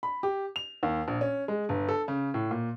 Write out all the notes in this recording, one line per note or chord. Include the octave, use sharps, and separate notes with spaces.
B5
G4
F7
D#2
A#1
C#4
G#3
G1
A4
C#3
A2
A#2